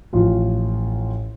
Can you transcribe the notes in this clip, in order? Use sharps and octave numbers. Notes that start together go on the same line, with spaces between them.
A1 F3 F4